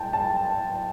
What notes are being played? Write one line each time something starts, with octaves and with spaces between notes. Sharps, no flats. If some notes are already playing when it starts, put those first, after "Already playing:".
Already playing: G5 A5
A5